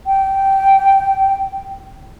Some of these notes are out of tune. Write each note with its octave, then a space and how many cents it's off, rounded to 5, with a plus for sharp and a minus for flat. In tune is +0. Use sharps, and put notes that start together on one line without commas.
G5 -15